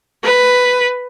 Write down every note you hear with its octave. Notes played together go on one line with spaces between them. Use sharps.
B4